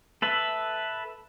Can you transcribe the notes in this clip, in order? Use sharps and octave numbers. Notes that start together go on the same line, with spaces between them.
A4 B4 E5